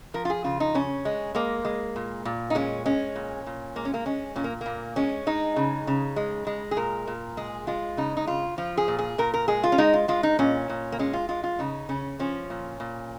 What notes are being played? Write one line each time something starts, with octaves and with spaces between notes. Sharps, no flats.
F3 A#4
F4
G#4
C#3 F4
D#4
C#3 C#4
G#3
G#3 A#3
G#3
A#2
A#2
D#4
G#3 C#4
G#3 C#4
A#2
A#2
G#3 A#3
C#4
A#3
G#3 C#4
A#2 C#4
A#3
A#2 A#3
G#3 C#4
G#3 D#4
C#3
C#3
G#3
G#3
G#4
A#2 A#4
A#2
G#3 G#4
G#3 F4
C#3 D#4
D#4
C#3 F4
F3 F4
G#4
A#2
G#4
A#2 A#4
A#4
G#3 G#4
F4
C#4
G#3 D#4
F4
G#3 F4
D#4
A#2 C#4
A#2
A#3
G#3 C#4
F4
G#3 F4
F4
C#3 D#4
C#3 C#4
F3 C#4
A#2
A#2